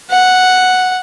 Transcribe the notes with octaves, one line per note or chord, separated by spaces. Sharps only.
F#5